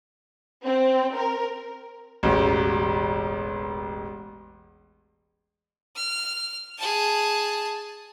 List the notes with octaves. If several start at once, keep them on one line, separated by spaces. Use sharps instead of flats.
C4
A#4
E1 A1
F6
G#4 A5